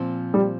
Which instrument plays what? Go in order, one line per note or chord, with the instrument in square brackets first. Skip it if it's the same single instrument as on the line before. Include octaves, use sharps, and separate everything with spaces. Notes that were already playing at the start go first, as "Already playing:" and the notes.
Already playing: [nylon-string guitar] A#2 F3 C4
[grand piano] G3